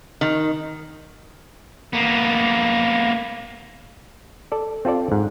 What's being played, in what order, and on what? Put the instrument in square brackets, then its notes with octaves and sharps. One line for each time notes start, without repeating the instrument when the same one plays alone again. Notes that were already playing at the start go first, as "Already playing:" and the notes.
[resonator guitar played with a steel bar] D#3
[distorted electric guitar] A#3 B3
[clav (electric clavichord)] A4 D5
C4 F4 A4 D5
G#2